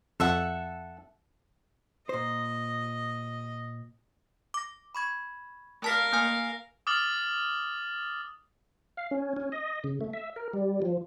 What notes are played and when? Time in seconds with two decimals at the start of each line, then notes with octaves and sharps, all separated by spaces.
0.20 F2 A4 E5 F#5
2.09 A#2 C5 D#5
4.54 D6 A#6
4.95 B5 C#6 G#6
5.82 A3 A#4 F5 A5 B6
6.13 A#3 G#5 F6
6.87 D6 D#6 F6 A6 F#7
8.97 F5
9.11 C#4
9.36 C#4
9.52 D#5
9.84 C#3
10.01 A3
10.13 E5
10.36 A#4
10.53 G3
10.82 F3